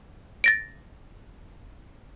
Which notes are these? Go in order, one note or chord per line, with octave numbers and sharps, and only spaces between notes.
A6 A#6 D7